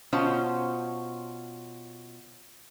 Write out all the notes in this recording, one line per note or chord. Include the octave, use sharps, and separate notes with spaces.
B2 C#4 F4 C5 A5